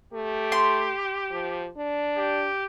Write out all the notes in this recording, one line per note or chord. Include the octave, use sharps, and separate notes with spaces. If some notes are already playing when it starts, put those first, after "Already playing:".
A3 G4
C6
F3
D4
G4